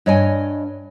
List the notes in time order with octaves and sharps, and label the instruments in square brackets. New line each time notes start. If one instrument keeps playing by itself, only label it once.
[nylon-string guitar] G2 C#5 D#5 G5 G#5